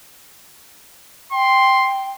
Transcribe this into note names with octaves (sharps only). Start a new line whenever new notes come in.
G5 C6